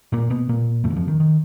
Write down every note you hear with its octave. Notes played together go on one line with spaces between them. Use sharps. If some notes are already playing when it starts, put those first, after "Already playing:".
A#2 A#3
B2 B3
A#2 A#3
F2 A2 C#3 A3
E3
F2 F3
D#3
D#3